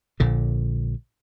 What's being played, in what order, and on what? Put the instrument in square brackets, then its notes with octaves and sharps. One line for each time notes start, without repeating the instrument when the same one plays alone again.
[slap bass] A#1 A#2 D3